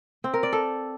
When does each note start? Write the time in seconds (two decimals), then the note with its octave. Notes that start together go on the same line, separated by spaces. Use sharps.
0.24 C4
0.34 A#4
0.43 D5
0.53 A4